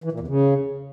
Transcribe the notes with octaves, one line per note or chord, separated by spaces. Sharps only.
E3
A#2
E2
C#3